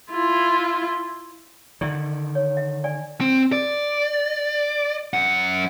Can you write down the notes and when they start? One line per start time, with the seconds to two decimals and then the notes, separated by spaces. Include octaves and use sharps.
0.12 E4 F4
1.81 D3 D#3 D5 E5
2.35 C#5
2.57 E5
2.84 D5 G#5
3.21 C4
3.52 D5
5.14 F#2 F#5